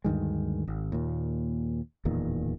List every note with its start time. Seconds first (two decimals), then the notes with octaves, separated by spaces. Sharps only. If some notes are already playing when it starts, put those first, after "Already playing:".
0.04 D2 G2 D#3 G#3
0.67 G#1
0.92 D#2 A#2
2.05 D1 E2 A#2 D#3